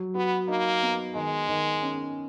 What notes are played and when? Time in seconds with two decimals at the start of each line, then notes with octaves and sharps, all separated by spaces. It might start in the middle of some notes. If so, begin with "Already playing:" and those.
Already playing: F#3
0.15 B3 F#4
0.48 A#3 D#4
0.83 B3
1.15 D#3 G#3
1.48 D#3
1.82 C#4